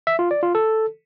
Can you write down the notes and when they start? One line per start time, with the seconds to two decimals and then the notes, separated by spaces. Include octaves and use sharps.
0.07 E5
0.19 F4
0.31 D5
0.43 F4
0.55 A4